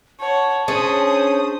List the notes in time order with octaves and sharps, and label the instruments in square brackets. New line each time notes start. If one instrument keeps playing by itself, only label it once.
[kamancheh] C#5 F#5 [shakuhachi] A5
[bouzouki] C#4 [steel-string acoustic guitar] D4 G#4 [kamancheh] C5 D#6